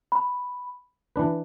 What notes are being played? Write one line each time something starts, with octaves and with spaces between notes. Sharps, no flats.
B5
E3 D4 B4